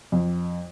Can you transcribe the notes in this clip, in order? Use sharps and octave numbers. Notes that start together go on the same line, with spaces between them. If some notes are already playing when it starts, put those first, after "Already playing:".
F2